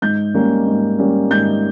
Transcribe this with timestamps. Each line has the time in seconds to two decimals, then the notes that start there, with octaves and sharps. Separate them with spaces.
0.02 G#2 G6
0.34 G3 A#3 C#4
0.67 G#2
0.98 G3 A#3 C#4
1.31 G#2 G6